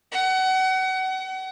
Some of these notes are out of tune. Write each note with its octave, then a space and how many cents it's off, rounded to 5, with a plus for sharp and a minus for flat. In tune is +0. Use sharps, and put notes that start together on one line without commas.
F#5 +30
F#5 +35